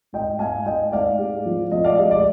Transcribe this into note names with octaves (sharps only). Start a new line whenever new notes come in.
G#2 D#5 G5
G#2 F5 G#5
G#2 D#5 G5
G#2 D5 F5
G#3
F3
F3 D#5
D5 F5
G#3 D#5
D5